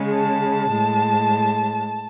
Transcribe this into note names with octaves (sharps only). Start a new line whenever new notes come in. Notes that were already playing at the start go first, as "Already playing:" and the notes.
Already playing: C#3 G#3
A5
A2 G#3